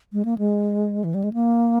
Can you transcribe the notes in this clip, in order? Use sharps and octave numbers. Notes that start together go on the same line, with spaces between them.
G#3
A#3
G#3
E3
G3
G#3
A#3